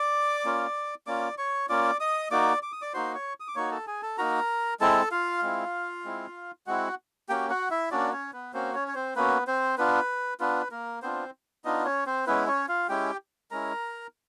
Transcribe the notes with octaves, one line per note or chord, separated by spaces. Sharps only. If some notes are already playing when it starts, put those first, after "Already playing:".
Already playing: D5 D6
A#3 C#4 F4
A#3 C#4 F4 D5 D6
C#5 C#6
A#3 C#4 F4 D5 D6
D#5 D#6
A#3 D#4 F#4 D5 D6
D6
D#6
D5 D6
A#3 D#4 F#4 C5 C6
C#5 C#6
D#6
D6
A#3 D#4 F#4 C#5 C#6
A4 A5
G#4 G#5
A4 A5
A#3 D#4 F#4 A#4 A#5
G#3 C4 E4 A4 A5
F4 F5
G#3 C4 E4
G#3 C4 E4
G#3 C4 E4 F#4 F#5
A#3 C#4 F#4 G4 G5
F#4 F#5
E4 E5
A#3 C#4 D4 F#4 D5
C#4 C#5
B3 B4
A#3 C4 C#4 F#4 C5
C#4 C#5
C#5
C4 C5
A#3 B3 C#4 F#4 B4
C4 C5
B3 D4 F4 B4
B3 D4 F4 B4
A#3 A#4
B3 C4 D4 F4 C5
B3 D4 D#4 F4 D#5
C#4 C#5
C4 C5
G#3 B3 C#4 E4 B4
C#4 C#5
F4 F5
G#3 C#4 E4 G4 G5
G#3 C#4 E4 A#4 A#5